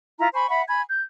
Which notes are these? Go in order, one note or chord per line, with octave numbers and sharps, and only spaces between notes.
E4 F4 A#5
C5 G#5 B5 C#6
E5 F#5 B5
G#5 B5 G#6
G6